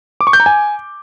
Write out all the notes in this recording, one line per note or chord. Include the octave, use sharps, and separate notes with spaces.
D6
C#6
G6
A#5
G#5